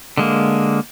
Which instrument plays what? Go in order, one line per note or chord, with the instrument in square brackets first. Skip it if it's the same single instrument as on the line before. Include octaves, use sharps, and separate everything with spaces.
[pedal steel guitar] D3 G#3 A#3